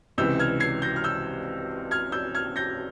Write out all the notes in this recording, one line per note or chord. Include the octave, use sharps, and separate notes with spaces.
C#2 C3 E3 E6 G6
F6 G#6
G#6 C7
G6 A#6
F6
E6 G6
F6 G#6
E6 G6
F6 G#6
G6 A#6